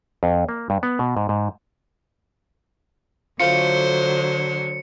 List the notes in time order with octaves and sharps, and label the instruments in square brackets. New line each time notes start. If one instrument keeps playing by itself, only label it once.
[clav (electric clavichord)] F2
A#3
G2
B3
B2
G#2
G#2
[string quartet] D3 F#3 [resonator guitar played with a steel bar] A3 F4 [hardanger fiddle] C5 [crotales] C#7